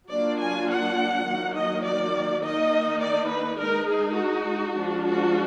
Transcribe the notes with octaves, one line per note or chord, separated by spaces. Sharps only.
F#3 A#3 D4 F4 D5
G#5
F#5
D#3 F#3 A#3
D#5
D5
D#3 A#3 D#4 D#5
D5
B4
G#3 D#4 A#4
G#4
F#4
F3 G#3 D4 F4
F#4